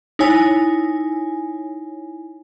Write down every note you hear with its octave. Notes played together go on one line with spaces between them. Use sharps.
D#4 E4 C#5 G#5